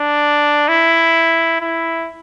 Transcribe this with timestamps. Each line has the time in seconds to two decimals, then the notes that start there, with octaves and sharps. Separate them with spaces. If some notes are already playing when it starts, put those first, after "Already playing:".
Already playing: D4
0.68 E4
1.61 E4